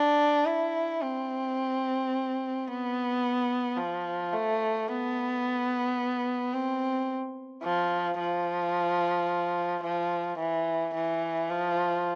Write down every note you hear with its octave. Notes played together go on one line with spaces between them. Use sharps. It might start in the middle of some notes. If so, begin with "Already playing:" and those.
Already playing: D4
E4
C4
B3
F3
A3
B3
C4
F3
F3
F3
E3
E3
F3